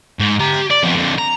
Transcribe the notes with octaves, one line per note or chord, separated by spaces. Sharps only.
G#2
G4 A#5
D5
F2 B3
F2 D3
A#5